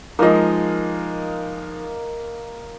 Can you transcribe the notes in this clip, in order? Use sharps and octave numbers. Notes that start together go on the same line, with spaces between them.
F3 G#3 A#3 D#4 D#5